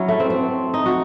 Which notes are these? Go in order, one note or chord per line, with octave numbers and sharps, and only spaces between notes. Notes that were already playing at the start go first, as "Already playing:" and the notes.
Already playing: F#3 C#4 E4
A3
C4
C4
D#4
F#4